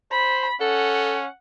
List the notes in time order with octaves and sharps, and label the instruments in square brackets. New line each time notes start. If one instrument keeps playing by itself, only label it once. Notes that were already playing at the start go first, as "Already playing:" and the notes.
[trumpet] C5 [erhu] B5
[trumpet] C#4 [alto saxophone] A4 [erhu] F#5